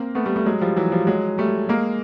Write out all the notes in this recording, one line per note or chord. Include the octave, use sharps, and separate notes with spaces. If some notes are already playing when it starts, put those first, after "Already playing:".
Already playing: A#3 C4
A3 B3
G3 A3
G3 A3
F#3 G#3
F3 G3
E3 F#3
F3 G3
F#3 G#3
G3 A3
G#3 A#3